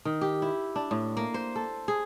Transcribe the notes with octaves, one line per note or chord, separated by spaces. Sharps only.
D#3
G4
E4
D4
A2
A#3
C5
A4
G#4